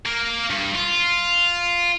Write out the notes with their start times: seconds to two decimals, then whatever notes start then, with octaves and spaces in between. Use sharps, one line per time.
0.06 A#3
0.50 G2
0.75 F4